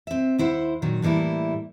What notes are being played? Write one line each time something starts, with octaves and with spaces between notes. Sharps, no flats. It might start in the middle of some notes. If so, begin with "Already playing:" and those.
C4 E5
D#2 E4 C5 F#5
A#2 D#3 F#3
A2 E3 G3 A#3 E4